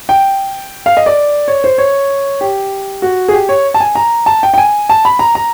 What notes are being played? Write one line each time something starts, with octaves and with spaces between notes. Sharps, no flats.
G5
F5
D#5
D5
C#5
C5
C#5
G4
F#4
G#4
G4
C#5
A5
G#5
A#5
A5
G5
G5
G#5
A5
B5
A#5
A#5